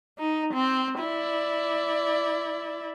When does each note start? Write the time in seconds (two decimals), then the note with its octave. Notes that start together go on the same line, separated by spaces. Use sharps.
0.19 D#4
0.53 C4
0.99 E4 D5